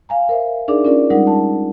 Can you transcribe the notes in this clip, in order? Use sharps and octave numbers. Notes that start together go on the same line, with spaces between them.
F5 G#5 A#5
A#4 C5 E5
D4 D#4 G#4 A#4 D5 D6
C#4 F4 A#4 D5
G3 G#3 D#4 A#4 F#5
A5